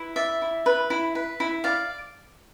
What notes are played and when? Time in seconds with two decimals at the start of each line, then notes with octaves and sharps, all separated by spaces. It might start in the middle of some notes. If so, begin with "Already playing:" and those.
Already playing: E4 B4
0.16 D5 E5
0.42 E4
0.66 B4
0.90 E4
1.15 B4
1.40 E4
1.64 D5 F5